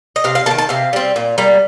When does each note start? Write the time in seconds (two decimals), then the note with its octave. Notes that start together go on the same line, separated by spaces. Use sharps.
0.16 D#5
0.24 C3 F5
0.35 F5
0.46 A#3 A5
0.51 D#3
0.58 A5
0.69 C3 F5
0.93 G3 C4
1.16 A#2
1.38 G3 A#3